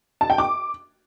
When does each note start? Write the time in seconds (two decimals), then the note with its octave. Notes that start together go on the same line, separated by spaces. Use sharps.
0.21 A5
0.30 G5
0.38 D6